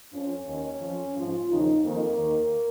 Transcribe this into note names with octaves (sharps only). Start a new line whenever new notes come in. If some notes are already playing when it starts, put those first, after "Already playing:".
F2 F3 C#4
D#2 D#3
F2 F3
G#2 F3 F4
D#2 C#3 F3 D#4
F2 D#3 A#3
D#2 D#3